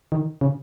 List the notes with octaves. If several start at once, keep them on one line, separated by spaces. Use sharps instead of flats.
D#3
C#3